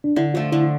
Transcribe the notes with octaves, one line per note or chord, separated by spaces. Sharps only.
D4
D3 E4
F3 A3 F4
D3 E4